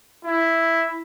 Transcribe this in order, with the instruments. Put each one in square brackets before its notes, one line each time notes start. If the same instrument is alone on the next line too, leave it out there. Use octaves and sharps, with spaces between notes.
[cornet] E4